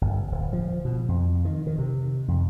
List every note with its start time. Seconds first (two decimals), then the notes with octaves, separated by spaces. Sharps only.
0.01 G1
0.32 D1
0.53 F3
0.85 B2
1.08 F2
1.45 D#3
1.67 D#3
1.78 C3
2.28 F2